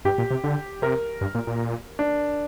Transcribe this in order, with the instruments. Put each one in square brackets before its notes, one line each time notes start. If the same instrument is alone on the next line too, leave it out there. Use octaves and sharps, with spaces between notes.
[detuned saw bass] G2 [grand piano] G4
[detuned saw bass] A#2
C3
D3
[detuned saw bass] C3 [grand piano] A#4
[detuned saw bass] G2
A#2
A#2
[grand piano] D4